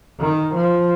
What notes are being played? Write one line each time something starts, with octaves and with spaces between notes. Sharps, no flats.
D#3
F3